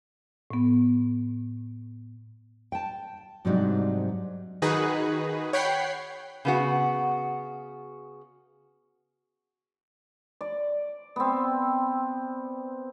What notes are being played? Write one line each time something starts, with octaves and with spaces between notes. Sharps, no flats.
A2 B3
G5 A5
G#2 C3 F#3 G3 D4 D#4
D#3 D#4 F#4 G#4 B4
C#5 F#5 G5 B5 C7
C#3 B3 F#4
D5
B3 C4